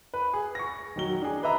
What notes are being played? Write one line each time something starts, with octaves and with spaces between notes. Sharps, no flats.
B4
G#4
C#6 A#6
D#3 F#3 G7
D4 G#4
B4 D#5 E5 A#5